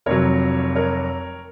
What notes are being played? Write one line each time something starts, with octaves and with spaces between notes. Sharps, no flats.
F1 F2 C3 F#3 A#4 C#5
A#4 C#5